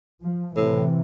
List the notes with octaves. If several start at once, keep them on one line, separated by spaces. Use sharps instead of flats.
F3
A2 C3 E3